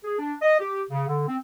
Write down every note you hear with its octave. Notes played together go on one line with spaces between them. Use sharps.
G#4
D4
D#5
G4
C#3
D3
C4